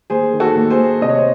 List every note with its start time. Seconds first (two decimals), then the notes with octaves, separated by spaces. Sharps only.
0.10 D#2 G#4 C5
0.33 D#3
0.40 F#4 A4
0.56 D#2
0.70 G#4 C5
0.79 D#2
1.01 C3 D#5
1.09 C#5
1.18 C5